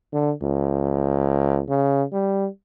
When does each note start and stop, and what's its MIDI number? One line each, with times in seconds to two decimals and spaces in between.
0.13 0.32 50
0.42 1.62 37
1.69 2.03 49
2.12 2.47 55